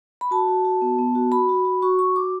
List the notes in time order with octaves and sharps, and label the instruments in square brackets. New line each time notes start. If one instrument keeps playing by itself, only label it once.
[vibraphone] B5
F#4 A5
F#4
F#4
B3
B3
F#4
F#4 B5
F#4
F#4
F#4 C#6
F#4 C#6
F#4 D6